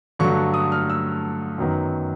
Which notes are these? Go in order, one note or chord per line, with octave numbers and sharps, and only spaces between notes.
G2 D3 F#3 A3 C#6
D#6
F6
E6
F#2 D#3 F#3 B3